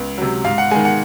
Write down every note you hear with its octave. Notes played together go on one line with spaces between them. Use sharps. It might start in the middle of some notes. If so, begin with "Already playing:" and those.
Already playing: C#2
C3 F#3
G#2 F5
F#5
D#3 G#3 G#5
F#5